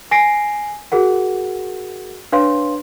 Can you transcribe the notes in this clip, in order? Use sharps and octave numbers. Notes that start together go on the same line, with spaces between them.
G#5 A#6 C7 D7
F#4 G#4 A#4 F#5
D4 B4 C#5 F5 C6